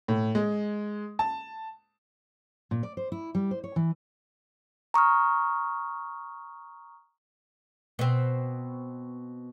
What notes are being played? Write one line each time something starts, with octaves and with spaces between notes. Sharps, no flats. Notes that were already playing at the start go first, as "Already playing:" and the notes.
A2
G#3
A5
A#2
D5
C5
E4
G3
C5
C#5
E3
A#5 C#6 D#6 F6
B2 C4